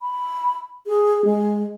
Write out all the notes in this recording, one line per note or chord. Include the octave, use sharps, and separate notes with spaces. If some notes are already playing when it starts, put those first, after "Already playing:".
B5
G#4
G#3